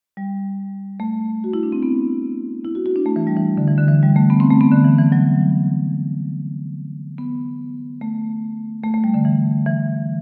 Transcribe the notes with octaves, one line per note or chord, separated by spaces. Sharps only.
G3
A3
F#4
E4
D4
C4
B3
E4
F#4
F#4
D4
A3
E3
G3
E3
D3
E3
D3
E3
G3
A3
B3
C4
A3
B3
D3
E3
E3
F#3
B3
A3
A3
A3
G3
D3
E3
E3